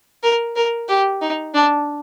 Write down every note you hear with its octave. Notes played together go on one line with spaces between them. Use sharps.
A#4
A#4
G4
D#4
D4